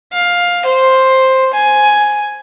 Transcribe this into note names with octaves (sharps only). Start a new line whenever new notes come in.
F5
C5
G#5